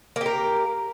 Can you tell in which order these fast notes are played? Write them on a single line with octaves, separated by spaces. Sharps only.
A#3 G4 A#4